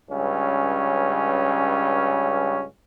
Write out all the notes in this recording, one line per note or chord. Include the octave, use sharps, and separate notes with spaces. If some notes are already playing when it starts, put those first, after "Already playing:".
C#2 G2 C#4